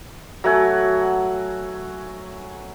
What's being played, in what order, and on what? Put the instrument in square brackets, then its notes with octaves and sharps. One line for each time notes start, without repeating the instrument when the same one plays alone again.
[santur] F#3 A3 F#5 G#5